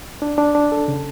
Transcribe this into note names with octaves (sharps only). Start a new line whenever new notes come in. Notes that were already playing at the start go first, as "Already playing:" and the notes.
D4
D4
D4
A4
C#3